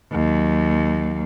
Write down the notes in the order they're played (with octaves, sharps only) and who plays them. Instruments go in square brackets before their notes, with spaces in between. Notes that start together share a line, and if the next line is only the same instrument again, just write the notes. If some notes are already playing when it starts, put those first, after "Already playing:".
[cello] D#2 F#3